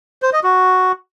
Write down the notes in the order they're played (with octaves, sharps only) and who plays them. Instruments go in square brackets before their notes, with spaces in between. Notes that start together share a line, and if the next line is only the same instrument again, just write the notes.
[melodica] C5
D#5
F#4